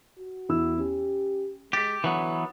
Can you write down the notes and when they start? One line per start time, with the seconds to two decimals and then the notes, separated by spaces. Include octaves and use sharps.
0.18 F#4
0.49 E2 E4 E6
0.78 C#4 G4
1.73 G#3 G4 A6 B6
2.04 D3 E3 F#3 B3